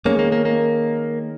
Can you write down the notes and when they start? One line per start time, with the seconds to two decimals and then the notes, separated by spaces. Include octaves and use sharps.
0.05 D#3 G#3 A#3 C#4
0.19 A#3
0.32 A#3
0.45 A#3